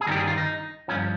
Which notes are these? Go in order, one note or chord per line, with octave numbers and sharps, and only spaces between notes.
G#4
G2 D#3 G3 G4 A#4
G#4
F4
D#4
G2 F3 C#4